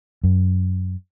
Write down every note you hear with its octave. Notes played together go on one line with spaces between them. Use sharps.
F#2